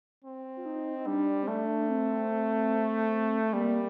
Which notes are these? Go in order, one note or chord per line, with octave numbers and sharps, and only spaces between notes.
C4
F4
D#4
D#4
G3 D4
C4
A3 D4
C4
G3 A#3